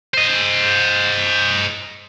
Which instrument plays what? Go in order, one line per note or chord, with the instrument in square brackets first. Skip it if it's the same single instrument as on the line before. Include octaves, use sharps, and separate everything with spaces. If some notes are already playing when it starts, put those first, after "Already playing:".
[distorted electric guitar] C5 D#5